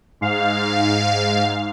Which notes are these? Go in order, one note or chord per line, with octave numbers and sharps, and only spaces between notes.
G#2 F5